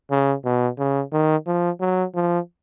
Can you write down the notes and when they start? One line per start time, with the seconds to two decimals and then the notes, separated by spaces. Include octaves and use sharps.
0.11 C#3
0.45 B2
0.79 C#3
1.12 D#3
1.47 F3
1.81 F#3
2.15 F3